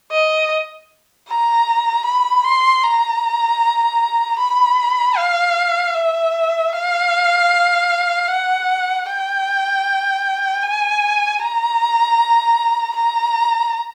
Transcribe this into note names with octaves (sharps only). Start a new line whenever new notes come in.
D#5
A#5
B5
C6
A#5
B5
F5
E5
F5
F#5
G5
G#5
A#5
A#5